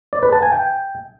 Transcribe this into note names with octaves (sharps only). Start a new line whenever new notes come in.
D5
B4
A5
G#5
G5